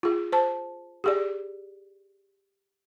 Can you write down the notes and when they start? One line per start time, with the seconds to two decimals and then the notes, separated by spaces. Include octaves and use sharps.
0.03 F4 G#4
0.32 C5 A5
1.04 G4 G#4 D5